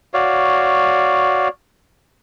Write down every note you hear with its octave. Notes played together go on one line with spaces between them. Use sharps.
F#4 C#5 D5 F5